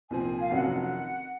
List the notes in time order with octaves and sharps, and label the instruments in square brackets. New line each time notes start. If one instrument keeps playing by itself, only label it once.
[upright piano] C2 A#2 F3 C4 [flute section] G#5
[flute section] F5
[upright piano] F1 F2 D#3 F#3 C#4 [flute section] F#5
[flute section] F#5
F#5